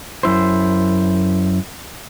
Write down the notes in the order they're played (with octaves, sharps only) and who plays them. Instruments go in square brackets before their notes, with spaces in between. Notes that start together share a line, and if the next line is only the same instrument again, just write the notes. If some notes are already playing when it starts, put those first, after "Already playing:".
[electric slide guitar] F#2 E4 C5